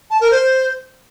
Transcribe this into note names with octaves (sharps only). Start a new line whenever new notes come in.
A5
A#4
C5